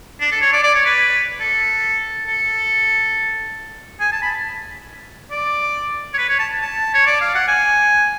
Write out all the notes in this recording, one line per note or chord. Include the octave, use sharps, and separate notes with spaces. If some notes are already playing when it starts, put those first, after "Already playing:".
D4
A4
C#5
D5
D5
C#5
B4
A4
A4
G#5
A5
B5
D5
C#5
B4
C#5
A5
A5
C#5
D5
F5
F#5
G#5